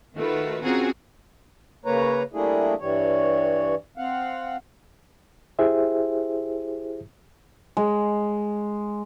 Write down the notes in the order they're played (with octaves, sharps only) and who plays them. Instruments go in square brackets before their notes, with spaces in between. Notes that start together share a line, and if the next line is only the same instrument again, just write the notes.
[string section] D#3 A3 F4 F#4 B4
C4 C#4 F4 F#4 G#4 A#4
[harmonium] C#3 A#3 B4 C#5 A#5
G3 A3 A#3 D4 E4 G#4
G2 E3 G3 C#5
C4 F5 F#5
[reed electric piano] E4 G4 G#4 C5 E5
[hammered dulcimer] G#3